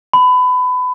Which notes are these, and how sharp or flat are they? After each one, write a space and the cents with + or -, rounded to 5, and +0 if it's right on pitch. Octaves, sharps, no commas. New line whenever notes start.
B5 +25